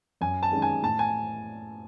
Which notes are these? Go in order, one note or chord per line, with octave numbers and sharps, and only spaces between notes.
F#2 G#5
A5
D#3 G#3 C#4
G#5
A2 A5
G#5